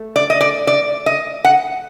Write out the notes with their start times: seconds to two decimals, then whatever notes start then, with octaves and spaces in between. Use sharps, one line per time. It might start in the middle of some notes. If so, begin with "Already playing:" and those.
Already playing: A3
0.16 D5
0.30 D#5
0.41 D5
0.67 D5
1.06 D#5
1.44 F#5